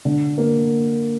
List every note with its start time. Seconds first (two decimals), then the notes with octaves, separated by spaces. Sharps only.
0.05 D3
0.38 A#3